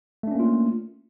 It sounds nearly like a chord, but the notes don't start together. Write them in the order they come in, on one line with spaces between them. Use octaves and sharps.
A3 D4 C#4 A#3 F4